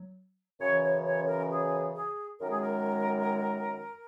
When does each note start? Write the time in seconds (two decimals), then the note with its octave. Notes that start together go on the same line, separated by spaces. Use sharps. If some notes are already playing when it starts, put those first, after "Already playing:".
Already playing: F#3
0.61 F#2 C#3 E3 C#5
0.83 C#5
1.05 C#5
1.28 A#4
1.50 G#4
1.95 G#4
2.40 F#2 D#3 G#3 A#4
2.51 G#4
2.61 A#4